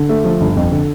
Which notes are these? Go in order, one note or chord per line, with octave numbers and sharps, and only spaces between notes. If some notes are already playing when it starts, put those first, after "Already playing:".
Already playing: D3
A3
F3
G1
F2
D3